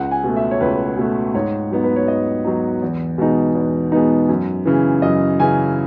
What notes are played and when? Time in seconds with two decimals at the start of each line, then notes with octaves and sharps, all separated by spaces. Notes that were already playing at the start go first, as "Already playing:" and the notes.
Already playing: C#2 F#5
0.11 G#5
0.24 B2 A3
0.36 E5
0.51 C#5
0.61 C#2 B4
0.97 B2 A3
1.34 G#2 C#5
1.71 F#3 B3 D#4
1.84 B4
1.96 C#5
2.08 G#2 D#5
2.45 F#3 B3 D#4
2.82 E2
3.18 B2 G#3 B3 D#4
3.55 E2
3.92 B2 G#3 B3 D#4
4.29 F#2
4.65 C#3 E3
5.02 F#2 D#5
5.40 C#3 E3 G#5